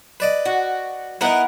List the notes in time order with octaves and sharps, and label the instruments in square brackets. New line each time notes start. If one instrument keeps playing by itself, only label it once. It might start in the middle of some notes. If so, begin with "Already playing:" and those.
[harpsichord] B4 D5 D#5
[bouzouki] F#4
[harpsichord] B3 D#4 [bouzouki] E4 A#4 F#5